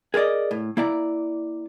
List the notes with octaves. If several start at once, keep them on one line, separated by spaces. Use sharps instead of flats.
G#4 A#4 C5 D5 D#5
A2
A#3 E4 D5 A5 A#5